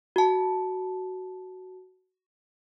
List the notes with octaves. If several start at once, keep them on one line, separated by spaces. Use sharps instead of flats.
F#4 A5